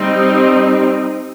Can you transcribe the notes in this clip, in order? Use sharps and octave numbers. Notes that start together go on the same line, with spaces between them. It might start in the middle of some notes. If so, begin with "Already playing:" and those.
Already playing: G3 C4 D#4